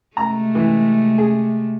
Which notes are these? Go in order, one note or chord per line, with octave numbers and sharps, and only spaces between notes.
C3 G#3 A3 A#5
E3
G#4